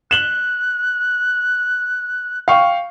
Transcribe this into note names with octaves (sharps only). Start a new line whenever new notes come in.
F#6 E7 F#7 G7
F5 G5 C#6